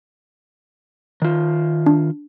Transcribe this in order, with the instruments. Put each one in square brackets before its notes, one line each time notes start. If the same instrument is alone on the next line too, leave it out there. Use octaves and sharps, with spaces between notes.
[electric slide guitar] D#3 F4
[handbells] D4